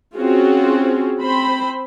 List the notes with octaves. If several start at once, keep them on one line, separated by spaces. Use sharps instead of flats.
C4 C#4 F4 F#4 G#4
C4 C5 B5